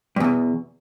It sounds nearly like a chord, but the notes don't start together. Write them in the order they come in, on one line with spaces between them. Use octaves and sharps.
G2 E2 B2